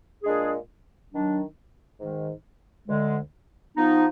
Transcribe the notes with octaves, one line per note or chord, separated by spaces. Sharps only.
A#2 G#3 D4 G#4
D#3 F#3 D4
G#2 D#3 G#3
D2 D3 G#3
F3 B3 D#4